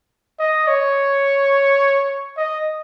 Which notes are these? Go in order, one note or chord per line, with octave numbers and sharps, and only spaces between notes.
D#5
C#5
D#5